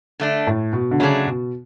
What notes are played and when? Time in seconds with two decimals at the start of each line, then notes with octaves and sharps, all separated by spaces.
0.20 D3 A3 D4
0.47 A2
0.73 B2
0.91 D3
1.00 C#3 F#3 A3 D4 G#4
1.26 B2